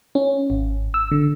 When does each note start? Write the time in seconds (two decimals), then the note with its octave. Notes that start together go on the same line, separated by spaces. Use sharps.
0.15 C#4
0.50 G#1
0.94 E6
1.11 D3